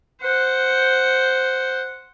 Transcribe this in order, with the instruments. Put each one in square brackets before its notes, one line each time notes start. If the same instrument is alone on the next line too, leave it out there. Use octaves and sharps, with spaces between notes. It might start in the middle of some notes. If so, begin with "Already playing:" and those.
[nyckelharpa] C5 F#5